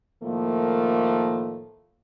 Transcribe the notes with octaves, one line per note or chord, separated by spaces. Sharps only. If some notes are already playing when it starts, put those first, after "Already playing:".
A2 D#3 F3 A3 A#3